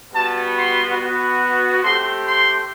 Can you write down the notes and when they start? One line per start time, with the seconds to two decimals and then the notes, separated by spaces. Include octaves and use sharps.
0.13 G3 B3 F#4 A5
0.56 C6
0.97 B3 F#4
1.83 A3 C4 G4 C6
2.25 C6